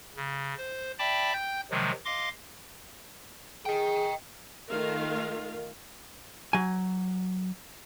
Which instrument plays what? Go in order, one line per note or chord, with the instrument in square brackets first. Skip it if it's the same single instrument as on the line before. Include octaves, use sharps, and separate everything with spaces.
[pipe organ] C#3
C5
D5 E5 G5 A5 B5 D6
G5 G6
C3 D#3 F3 F#3 G#3
D#5 F5 C6 D6
[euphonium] G#4 [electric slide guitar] D#5 G5
[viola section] D#3 A3 F4 A#4 F5
[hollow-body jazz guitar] F#3 G#5